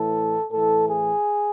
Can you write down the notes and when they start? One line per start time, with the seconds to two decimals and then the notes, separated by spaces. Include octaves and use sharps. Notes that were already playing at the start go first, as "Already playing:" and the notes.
Already playing: A2 E3 A4
0.51 A2 E3 A4
0.89 G#4